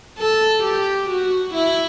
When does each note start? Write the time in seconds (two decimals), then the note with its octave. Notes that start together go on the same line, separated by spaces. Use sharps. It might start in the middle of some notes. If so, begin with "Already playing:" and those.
0.18 A4
0.64 G4
1.10 F#4
1.54 E4